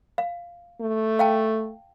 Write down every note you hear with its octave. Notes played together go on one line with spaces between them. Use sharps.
F5
A3
F5 G5 A5